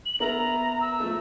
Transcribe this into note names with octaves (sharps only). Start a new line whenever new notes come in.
F#7
B3 A#4 E5 A#5
E6
F3 A3 A4